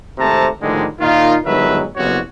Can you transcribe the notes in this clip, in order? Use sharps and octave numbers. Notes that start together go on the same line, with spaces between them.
G#1 C3 A3 C4 A5 A#5
A2 D3 D#3 F3 G3 G#3
A#2 D#3 D#4 F4
G1 D#3 F#3 G#3 B4 E5
F#1 C2 F2 B3 F#4 C#5